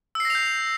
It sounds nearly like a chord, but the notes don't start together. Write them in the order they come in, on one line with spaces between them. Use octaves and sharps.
E6 C7 A#6 F7 G6